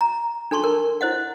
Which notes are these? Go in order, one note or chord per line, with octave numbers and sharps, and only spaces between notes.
A#5
D4 A4 A5 C6 C#6
A#4
E4 C5 D#5 F#5